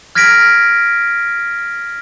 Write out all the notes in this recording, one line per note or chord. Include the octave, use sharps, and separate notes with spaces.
F6 G#6 A#6 B6 D7